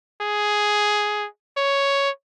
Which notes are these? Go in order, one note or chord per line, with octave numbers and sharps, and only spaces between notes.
G#4
C#5